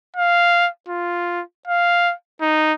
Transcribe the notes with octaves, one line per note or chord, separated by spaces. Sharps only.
F5
F4
F5
D#4